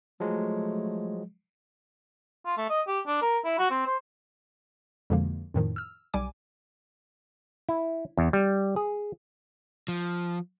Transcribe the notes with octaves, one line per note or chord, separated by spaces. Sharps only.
F3 F#3 G#3 A3
F4
A3
D#5
G4
D4
A#4
E4
F#4
C4
C5
F2 B2 D3 F3 G#3 A#3
F2 A2 D#3 F3
E6 F6
B1 G3 G#5 D6
E4
E2
G3
G#4
F3